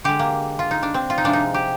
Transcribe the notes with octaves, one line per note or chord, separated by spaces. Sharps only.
D3 G#3 G4
A#3
F4
D#4
D4
C4
F4
D#4
C3 F3 G#3 D4
D#4
G4